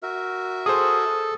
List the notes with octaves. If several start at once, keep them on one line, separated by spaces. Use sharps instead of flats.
F#4 A#4 E5
G#4 A4 C5 D#6